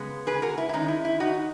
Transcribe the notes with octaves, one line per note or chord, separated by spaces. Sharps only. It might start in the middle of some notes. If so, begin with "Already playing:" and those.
Already playing: C#3 G#3 B3
G#4 B4
F#4 A#4
E4
E4
D#3 G#3 C#4 D#4
E4
E4
D#4 F#4